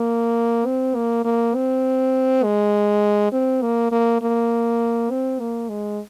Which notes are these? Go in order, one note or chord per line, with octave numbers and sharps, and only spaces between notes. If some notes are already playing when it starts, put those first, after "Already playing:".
Already playing: A#3
C4
A#3
A#3
C4
G#3
C4
A#3
A#3
A#3
C4
A#3
G#3